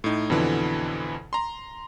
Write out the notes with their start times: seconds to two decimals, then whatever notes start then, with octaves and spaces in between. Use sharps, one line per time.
0.04 A2 D#4
0.30 F2 B2 D3 E3
1.33 A#5 C6